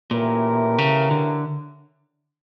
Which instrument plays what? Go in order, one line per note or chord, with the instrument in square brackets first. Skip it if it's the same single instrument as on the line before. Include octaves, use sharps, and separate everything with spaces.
[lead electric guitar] A#2 [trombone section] E3 A3 C#4 G4 A#4
[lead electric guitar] C#3
D3